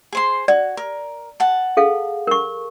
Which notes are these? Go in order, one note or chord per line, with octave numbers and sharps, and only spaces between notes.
G#4 C5 C6
F#4 D5
A#4
F#5 A5
G#4 A4 F5
A#4 C#6